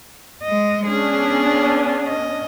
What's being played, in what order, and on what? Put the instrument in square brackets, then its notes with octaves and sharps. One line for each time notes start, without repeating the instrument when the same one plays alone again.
[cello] G#3 D#5
[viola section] B3 C#4 D4 [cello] G#4
[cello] D#5